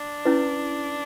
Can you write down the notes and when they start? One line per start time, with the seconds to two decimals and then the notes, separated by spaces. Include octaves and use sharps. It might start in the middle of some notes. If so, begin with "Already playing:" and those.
Already playing: D4
0.25 C#4 E4 B4